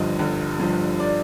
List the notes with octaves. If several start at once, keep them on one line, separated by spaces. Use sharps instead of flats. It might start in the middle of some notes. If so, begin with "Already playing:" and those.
Already playing: G1 G2 F3 D#5
G1
G2 F3
D5